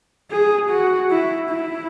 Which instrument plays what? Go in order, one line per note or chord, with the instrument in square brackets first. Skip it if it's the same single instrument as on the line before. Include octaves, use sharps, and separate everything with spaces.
[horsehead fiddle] G#4
F#4
E4
E4